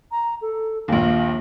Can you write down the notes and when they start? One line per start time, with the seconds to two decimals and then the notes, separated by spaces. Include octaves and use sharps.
0.11 A#5
0.42 A4
0.88 A#1 D#2 F5